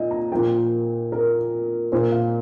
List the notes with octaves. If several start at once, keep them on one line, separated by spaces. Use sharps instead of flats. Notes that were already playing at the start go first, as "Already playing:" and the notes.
Already playing: A#2 D#5
A#5
A#2 F3 A#3 G5
A#4
A#2 A#3 C5
F5